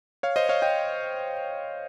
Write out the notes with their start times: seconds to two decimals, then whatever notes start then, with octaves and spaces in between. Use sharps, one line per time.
0.23 C#5 F5
0.36 C5 D#5
0.49 C#5 F5
0.62 D#5 G5